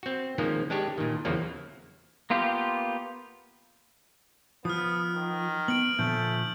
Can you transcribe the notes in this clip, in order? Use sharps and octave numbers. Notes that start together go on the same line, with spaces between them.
C4 F#4
D#3 F3 G#3 A#3 C#4
G#3 D4 G4 C#5
A#2 D#3
E2 C#3 F3 F#3 A#3
A#3 B3 F4 G4
F3 B3 D#6 F6
D#3
B3 D7 F#7
A#2 D3 F3 A3 G6